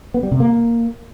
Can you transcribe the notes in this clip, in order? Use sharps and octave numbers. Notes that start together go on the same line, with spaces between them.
B3
G3
C3
A#3